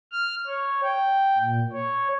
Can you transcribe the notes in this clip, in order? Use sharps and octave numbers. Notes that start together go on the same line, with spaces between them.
F6
C#5
G5
A#2
C#5